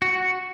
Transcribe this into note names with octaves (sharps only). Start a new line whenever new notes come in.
F#4